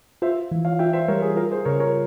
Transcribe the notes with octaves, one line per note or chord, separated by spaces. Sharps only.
F4 C5 E5
E3
C#5 F5
F4 E5 G5
C5 E5
G3 A#4 C#5
G#4
F4 A#4
G#4 C5
C#3 A#4 C#5
A#4 C#5